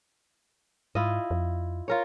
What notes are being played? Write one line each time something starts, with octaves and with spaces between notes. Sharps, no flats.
G#2 E4 F4 D#5
F2
F4 A#4 C#5